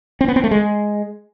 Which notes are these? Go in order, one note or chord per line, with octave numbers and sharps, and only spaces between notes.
C4
B3
C4
A3
G#3